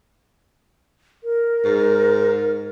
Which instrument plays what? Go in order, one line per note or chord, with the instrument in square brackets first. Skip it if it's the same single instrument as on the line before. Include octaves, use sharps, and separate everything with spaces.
[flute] A#4
[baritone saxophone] G#2